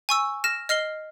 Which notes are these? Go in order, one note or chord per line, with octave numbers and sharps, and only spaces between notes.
G#5 C#6 E6
F6 A#6 E7
D#5 F6 C7 G7